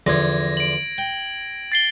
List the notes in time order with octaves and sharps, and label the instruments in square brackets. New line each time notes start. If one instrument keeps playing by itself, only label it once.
[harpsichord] E2 D3 F3 [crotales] G#6 A#6
[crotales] D7 F#7
[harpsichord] G5
[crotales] A6 C7 G7